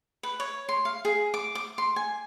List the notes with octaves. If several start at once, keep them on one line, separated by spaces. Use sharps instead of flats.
B4
C#5
C6
F5
G#4
D6
D6
C6
G#5